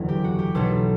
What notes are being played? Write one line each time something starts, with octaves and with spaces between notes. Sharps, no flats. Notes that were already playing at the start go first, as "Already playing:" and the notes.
Already playing: F#1 E2 D3 F#3
G4
F#4
G4
B1 B2 F#3 A3 A4